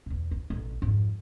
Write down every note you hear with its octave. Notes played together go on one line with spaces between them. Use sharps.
E2 B2
E3
A1 B2
F2 G#2